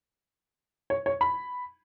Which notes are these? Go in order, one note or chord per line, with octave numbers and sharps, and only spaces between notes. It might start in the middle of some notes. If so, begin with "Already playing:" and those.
C#5
C#5
B5